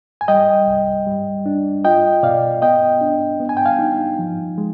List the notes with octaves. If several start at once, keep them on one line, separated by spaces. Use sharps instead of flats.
G#5
G3 D#5 G5
C2
G3
D4
F4 D#5 G5
B2 D5 F5
B3 D#5 G5
D4
B3
G#5
G5
F5 G#5
D#4
F3
G#3